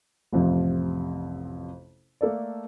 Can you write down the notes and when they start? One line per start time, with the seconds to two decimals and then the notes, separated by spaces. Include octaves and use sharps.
0.32 A1 F2 C3 F3
2.21 A3 A#3 A4 D5